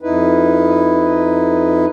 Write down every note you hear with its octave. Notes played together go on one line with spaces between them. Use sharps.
F2 D#4 E4 B4